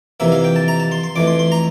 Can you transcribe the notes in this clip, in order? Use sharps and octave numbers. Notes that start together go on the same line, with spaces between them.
F2 C3 E3 A#3 E5
F5
G5
A5
A#5
A5
C6
C6
F2 E3 A3 D6
C6
C6
A#5